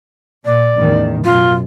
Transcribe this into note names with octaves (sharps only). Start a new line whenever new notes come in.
A#2 D5
A1 E2 D#3
F#2 B2 F4